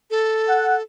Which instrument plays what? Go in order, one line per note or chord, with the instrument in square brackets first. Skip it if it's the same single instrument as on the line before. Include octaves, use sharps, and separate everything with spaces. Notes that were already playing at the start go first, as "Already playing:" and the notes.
[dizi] A4
[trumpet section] F#5